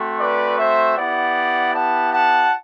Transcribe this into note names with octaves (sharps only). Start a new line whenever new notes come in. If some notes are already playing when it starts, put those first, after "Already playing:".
Already playing: A3 C4 F#4
B4 D5
C5 E5
B3 E4 G4 D5 F#5
F#5 A5
F#5 A5